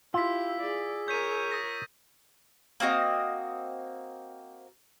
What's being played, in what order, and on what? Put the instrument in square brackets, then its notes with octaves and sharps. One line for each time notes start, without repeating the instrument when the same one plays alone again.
[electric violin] E4 G4 [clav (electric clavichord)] F4 [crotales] E6 B6
[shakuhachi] G#4 [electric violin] D5
[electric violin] A#4 C#5 [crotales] G6 B6 D#7
[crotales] D#6 A6 A#6
[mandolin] A#3 C4 F#4 D#5